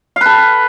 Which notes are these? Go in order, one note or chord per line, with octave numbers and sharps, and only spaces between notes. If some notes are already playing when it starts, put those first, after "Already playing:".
A4 B4 F5